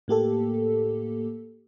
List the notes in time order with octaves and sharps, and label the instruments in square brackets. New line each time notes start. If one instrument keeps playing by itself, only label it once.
[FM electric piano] A2 A#3 G4 A4